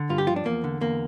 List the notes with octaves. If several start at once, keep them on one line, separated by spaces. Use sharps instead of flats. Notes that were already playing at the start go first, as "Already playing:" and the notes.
Already playing: D3
G2 F4
G4
F3 F4
D4
E2 A#3
D3
E2 A#3